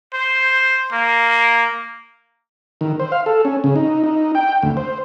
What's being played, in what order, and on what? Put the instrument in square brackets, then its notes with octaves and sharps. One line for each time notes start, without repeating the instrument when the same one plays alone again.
[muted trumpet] C5
A#3
[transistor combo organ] D#3
C5
F5
A4
C#4
C#3
D#4
D#4
G5
D2
C5